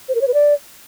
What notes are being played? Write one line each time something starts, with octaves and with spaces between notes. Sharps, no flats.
C5
A#4
C#5
B4
D5